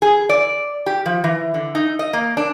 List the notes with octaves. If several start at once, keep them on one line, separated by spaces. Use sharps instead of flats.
G#4
D5
G4
F3
E3
D3
D#4
D#5
A#3
D4